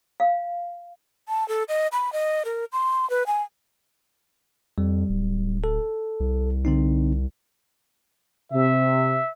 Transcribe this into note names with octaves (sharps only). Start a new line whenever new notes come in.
F5
A5
A4
D#5
B5
D#5
A#4
C6
B4
G#5
F2 G3
D1
A4
C2
D3 C4 D#4
C3 E5